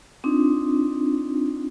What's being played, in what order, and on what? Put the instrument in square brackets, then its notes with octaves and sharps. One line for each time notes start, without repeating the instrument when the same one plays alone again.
[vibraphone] C4 D4 D#4 F4